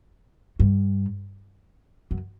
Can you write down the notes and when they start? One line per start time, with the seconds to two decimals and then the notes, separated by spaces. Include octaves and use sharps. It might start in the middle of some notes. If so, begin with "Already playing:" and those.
0.59 G2
2.11 F#2